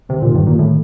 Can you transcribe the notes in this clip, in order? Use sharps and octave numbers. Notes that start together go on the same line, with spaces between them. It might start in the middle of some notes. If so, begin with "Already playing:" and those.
C3 D#3
D3
A#2 D#3
G2
A#2
A2